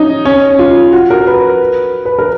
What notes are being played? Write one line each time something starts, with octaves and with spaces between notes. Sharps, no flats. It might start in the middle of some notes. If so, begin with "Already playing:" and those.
Already playing: C#4 D#4
C#4
F4
F#4
A#4
B4
B4
A#4